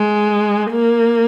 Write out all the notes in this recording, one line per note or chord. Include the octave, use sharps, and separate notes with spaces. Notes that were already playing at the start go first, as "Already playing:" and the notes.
Already playing: G#3
A#3